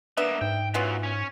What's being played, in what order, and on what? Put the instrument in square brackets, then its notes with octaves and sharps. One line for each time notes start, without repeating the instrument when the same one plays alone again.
[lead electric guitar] A#3 B3 [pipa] D4 B4 E5
[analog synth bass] G#2 [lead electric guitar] G5
[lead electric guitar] F#2 F#3 [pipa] E3 B3 F4
[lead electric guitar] C#4 C#5